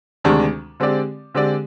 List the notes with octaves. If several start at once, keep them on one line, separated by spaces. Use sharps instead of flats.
D2 C3 D#3 G#3 D4
D3 G#3 C4 G4 D5
D3 G#3 C4 G4 D5